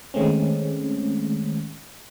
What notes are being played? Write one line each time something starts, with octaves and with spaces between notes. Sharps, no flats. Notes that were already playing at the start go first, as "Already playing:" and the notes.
D#3 G#3 A3 C4 C#4